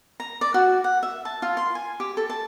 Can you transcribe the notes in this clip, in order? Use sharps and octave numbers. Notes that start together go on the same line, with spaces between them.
A#5
D5
F#4
F#5
E5
A5
F4
C6
G#5
G4
A4
A5